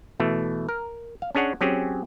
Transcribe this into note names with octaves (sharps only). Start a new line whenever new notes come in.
B2 E3 A3
A#4
F5
C#4 D4 G#4 C#5 F#5
F#3 C4 C#4 G4 G#4